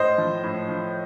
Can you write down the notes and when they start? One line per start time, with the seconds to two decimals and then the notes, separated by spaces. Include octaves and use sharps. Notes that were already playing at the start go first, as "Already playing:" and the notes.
Already playing: A2 C5 D#5
0.18 F3
0.43 A2
0.68 F3